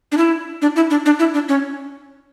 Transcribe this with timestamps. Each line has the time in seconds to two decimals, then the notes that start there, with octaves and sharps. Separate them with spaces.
0.12 D4
0.18 E4
0.62 D4
0.76 E4
0.90 D4
1.06 D4
1.19 E4
1.34 D4
1.49 C#4